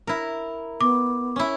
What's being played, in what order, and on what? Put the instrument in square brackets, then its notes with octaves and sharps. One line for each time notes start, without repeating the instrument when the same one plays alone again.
[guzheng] E4 A#4
[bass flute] B3 [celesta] D6
[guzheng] C#4 E4